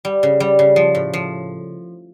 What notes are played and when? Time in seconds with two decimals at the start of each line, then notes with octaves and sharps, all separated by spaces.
0.05 G3
0.23 C#3
0.40 G3
0.59 C#3
0.76 F3
0.95 A2
1.13 F3